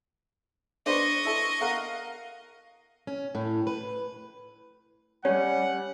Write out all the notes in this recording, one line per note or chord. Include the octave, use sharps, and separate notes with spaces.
D4 B4 C5 D#5 C#6
E4 A4
A#4 F5 F#5
C#4
A2
B4
G3 C#4 G4 C#5 F#5